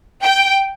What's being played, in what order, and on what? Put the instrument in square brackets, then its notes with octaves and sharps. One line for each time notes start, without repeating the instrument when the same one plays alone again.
[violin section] G5